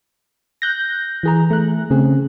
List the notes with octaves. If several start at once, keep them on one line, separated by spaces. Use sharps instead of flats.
F#6 G6 A#6
E3 G#4 A#5
A3 F#6
C#3 C4 G#4